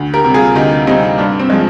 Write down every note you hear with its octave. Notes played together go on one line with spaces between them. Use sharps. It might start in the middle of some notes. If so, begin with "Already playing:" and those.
Already playing: D2
G4 A#4
C3 G3
F4 G#4
D2 D#4 G4
C3 G3 C4 D#4
G2 D4
C4
F3 G#3